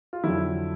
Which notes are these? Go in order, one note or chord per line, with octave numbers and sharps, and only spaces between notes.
F4
F2 D3 F#3 E4